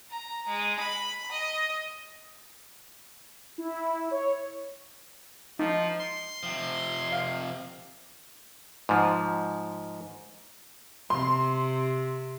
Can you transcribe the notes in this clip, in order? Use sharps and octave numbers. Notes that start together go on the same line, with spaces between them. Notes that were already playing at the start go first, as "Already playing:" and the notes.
A#5
G#3
B5
D#5
E4
C#5
F3 D#4
C6
C3 F3
F5
G#2 F3
C3 C6